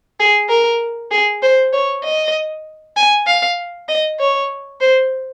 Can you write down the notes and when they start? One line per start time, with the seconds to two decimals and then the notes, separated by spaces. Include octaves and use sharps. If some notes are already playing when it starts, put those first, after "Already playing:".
0.20 G#4
0.49 A#4
1.12 G#4
1.42 C5
1.73 C#5
2.04 D#5
2.97 G#5
3.27 F5
3.89 D#5
4.20 C#5
4.81 C5